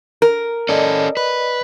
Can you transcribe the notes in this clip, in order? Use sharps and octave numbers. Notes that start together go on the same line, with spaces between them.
A#4
C#4 A4 D5 D#5
B4